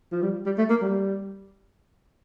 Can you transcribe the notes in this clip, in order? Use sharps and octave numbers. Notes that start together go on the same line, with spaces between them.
F3
G3
G3
A3
A#3
G3